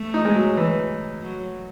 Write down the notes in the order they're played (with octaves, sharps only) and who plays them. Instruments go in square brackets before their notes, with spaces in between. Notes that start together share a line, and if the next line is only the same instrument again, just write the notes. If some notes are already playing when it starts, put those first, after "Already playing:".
Already playing: [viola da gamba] A3
[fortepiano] D#4
G#3
F#3
E3
[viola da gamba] F#3